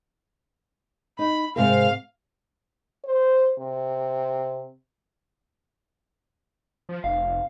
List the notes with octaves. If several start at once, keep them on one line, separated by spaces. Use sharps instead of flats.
D#4 B5
G#2 C3 A#4 F5
C5
C3
F3
F1 F5